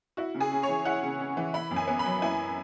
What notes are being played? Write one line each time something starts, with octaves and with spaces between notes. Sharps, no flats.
E4 F#4
C#3
G#4
C#4
C#5
E3
E4 F#5
C#3
C#4
E3
E4 B5
F#2
G#5
B3
B5
F#3
E4 G#5